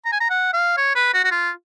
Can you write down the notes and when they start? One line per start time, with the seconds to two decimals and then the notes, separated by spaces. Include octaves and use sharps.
0.05 A#5
0.12 G#5
0.20 A#5
0.30 F#5
0.53 F5
0.77 C#5
0.95 B4
1.14 F#4
1.25 F#4
1.31 F4